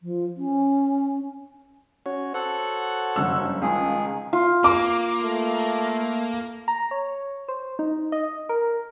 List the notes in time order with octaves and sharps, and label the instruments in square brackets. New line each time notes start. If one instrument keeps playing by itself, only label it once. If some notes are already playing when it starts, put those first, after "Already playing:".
[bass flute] F3
C#4
[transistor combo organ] C#4 F#4 C#5
[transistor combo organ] F#4 C5 C#5 [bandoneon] A4 F#5
[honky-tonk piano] F#1 G2 E6
[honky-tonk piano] C#2 [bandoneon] D#3 F3 G#4
[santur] F4
[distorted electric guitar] A#3 [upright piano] D6
[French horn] A3
[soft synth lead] A#5
C#5
C5
D#4
D#5
A#4